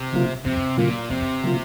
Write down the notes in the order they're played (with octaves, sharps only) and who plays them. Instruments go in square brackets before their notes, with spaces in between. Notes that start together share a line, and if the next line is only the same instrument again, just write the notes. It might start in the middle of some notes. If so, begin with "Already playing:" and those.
Already playing: [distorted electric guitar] C3
[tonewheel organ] C#3 F#3 A#3 F4
[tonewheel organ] F2 [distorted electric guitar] C3
[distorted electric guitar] A#2 [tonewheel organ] C#3 F#3 A#3 F4
[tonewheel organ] F2 [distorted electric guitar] C3
[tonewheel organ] C#3 F#3 A#3 F4